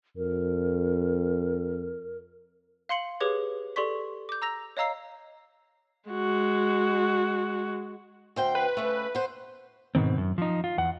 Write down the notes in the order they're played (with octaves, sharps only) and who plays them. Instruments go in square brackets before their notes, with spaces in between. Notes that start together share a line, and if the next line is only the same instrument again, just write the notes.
[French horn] F2 [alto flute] A#4
[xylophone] F5 C6 C#7 F#7
G4 G#4 B4 C#5 D6 G#6
G4 A4 D5 C6 C#6 B6
D6 G6
A#5 E6 A#6 F7
C#5 D#5 F5 A#5 E6 C7
[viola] G#3 F#4
[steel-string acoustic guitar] D2 C5 G5
[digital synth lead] B4
[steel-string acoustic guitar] C#3 A3
B3 C5
[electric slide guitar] G#2 B2 D#3 C4
F#2
F3 D#4
F4
E2 F#5